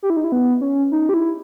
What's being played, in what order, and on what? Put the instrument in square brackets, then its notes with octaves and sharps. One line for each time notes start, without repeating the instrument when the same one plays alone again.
[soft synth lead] G4
E4
D#4
E4
B3
C#4
D#4
G4
E4